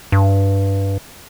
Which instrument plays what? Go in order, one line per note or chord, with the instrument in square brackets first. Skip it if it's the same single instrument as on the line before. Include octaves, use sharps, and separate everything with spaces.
[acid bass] G2